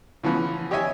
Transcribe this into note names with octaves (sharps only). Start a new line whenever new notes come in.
C#3 E3 F3 B3
G4 C#5 D#5 E5 G#5